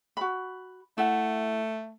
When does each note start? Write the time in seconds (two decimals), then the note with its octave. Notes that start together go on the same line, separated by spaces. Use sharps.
0.17 F#4 B5
0.98 A3 E4 F#5